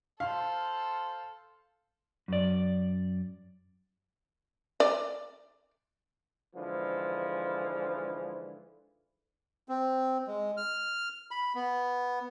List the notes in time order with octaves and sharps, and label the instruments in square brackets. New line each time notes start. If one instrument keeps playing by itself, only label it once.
[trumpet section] F4 C5 [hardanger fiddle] A4 [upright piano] F5
[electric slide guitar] F#2 D5
[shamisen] D5
[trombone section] G#2 D3 E3 F3
[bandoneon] C4
G#3
F6
B5
B3